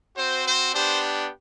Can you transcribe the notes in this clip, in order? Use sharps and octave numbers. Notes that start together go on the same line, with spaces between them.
C4 F#4 C5
C5
B3 D4 G4 C5